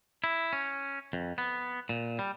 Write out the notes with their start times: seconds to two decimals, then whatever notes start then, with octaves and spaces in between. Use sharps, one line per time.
0.24 E4
0.53 C#4
1.13 F2
1.38 B3
1.89 A#2
2.19 G3